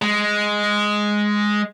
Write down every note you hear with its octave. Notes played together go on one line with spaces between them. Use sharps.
G#3